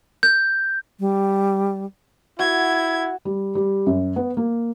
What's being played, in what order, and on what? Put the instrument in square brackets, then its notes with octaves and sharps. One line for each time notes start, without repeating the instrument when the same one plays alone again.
[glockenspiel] G6
[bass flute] G3
[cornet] E4 [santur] F#4 [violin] G#6
[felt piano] G3
G3
F#2
B3
A#3